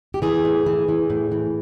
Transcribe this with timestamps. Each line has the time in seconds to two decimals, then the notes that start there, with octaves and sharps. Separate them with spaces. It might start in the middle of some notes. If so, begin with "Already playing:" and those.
0.14 G4
0.22 E3 G#4
0.45 A2
0.66 E3
0.89 E3
1.10 A2
1.32 E3